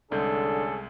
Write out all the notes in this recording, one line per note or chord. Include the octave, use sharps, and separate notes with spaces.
C2 D3 G#3 C#4 G#4 A4 G6